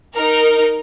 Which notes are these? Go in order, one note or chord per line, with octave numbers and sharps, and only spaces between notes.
D#4 A#4